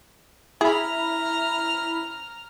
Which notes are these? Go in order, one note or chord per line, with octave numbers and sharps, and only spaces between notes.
E4 G#4 A#5 B5 F6